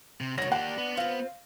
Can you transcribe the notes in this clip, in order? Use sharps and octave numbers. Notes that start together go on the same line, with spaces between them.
C3
C2 D#3 F#4 C#5 A#6
A#3 D4 G4 F#5
B3
C4 F4 F5